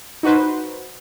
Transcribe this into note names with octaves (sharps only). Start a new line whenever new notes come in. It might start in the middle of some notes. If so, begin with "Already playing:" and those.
D#4 F#4 B4 C5